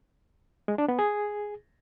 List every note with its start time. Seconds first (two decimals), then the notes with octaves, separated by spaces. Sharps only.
0.68 G#3
0.78 D4
0.88 B3
0.99 G#4